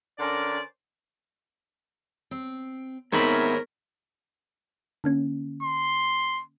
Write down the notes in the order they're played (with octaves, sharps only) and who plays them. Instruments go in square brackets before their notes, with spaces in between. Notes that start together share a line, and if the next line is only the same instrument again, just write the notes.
[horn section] D3 C#4 A#4 C5 D5
[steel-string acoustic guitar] C4
[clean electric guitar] D#2 C#5 B5 [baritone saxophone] G#2 [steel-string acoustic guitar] B3 C4 E4 [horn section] A#4
[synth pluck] D3 A#3 C#4
[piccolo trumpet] C6